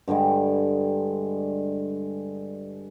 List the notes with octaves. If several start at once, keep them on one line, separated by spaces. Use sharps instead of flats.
G2 D3 G3 G#3